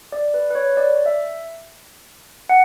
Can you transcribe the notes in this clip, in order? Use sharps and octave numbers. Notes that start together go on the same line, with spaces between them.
D5
B4
B4
C#5
D5
E5
F#5